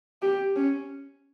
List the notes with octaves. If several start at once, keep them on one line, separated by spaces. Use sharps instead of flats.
G4
C#4